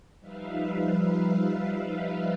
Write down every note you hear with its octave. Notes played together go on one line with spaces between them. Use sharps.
F3 G3 D#4 B4 E5 F5